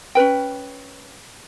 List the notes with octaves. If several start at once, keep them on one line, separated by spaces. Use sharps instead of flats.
C#4 A#4 B4 G5